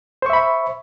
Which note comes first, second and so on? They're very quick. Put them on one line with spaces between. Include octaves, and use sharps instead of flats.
C5 C#6 E5 B5